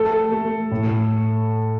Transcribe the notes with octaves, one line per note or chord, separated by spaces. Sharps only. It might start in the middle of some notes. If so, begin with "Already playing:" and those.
Already playing: A3 A4
A3
A2